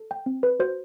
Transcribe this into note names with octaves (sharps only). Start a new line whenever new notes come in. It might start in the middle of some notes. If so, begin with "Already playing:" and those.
Already playing: A4
G5
C4
B4
F#4 C5